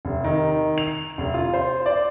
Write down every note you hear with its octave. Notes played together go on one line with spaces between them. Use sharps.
F1
D#3
F7
F1
F4
C5
D5